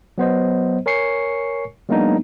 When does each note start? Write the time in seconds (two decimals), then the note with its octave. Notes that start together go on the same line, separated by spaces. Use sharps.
0.18 F#3 B3 C5 D#5
0.86 A#4 C#5 G#5 C#6 C7 C#7
1.89 F#3 G#3 A#3 B3 D4 D#4